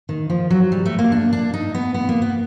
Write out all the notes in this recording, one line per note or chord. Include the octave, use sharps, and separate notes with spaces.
D#3
F3
F#3
G3
A3
A#3
D4
D4
D#4
B3
B3
A#3
B3